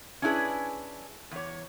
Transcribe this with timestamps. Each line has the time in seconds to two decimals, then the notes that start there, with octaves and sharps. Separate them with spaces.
0.22 C#4 D4 E4 G4 G#4 B4
1.31 E2 C#5